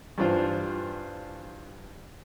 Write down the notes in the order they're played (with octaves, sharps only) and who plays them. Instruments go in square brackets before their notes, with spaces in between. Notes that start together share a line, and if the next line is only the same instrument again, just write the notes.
[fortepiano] G2 E3 D4 F4 C5